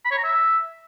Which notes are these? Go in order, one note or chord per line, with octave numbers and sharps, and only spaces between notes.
B5
C#5
A#5
E5